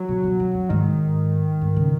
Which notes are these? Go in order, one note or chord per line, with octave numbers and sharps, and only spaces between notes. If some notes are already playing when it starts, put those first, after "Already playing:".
Already playing: F#3
B2
B2
F#2
F#2
G#2 D#3
G#2
C#3